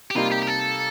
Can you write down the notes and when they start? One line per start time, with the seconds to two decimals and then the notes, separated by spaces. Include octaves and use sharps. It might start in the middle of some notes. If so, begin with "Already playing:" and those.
0.11 G4
0.15 C3 G3 A#3 D#4 F4
0.32 G4
0.42 G4
0.47 A4